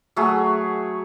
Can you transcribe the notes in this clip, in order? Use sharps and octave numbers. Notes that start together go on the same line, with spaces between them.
F#3 A3 F#4 G#4